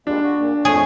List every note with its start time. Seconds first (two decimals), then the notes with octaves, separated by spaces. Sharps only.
0.07 G3 G#3 A#3 D4
0.23 F#4
0.37 A#2
0.65 F2 A3 G#4 C#5